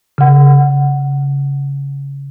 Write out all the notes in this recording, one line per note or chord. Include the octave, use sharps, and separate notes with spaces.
C#3 F#5